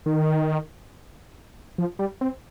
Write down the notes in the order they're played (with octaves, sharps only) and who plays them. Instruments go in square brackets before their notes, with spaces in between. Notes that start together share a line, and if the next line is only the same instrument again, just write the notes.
[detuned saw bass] D#3
F3
G3
C4